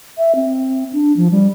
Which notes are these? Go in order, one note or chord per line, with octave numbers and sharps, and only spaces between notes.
E5
C4
D4
F3
G3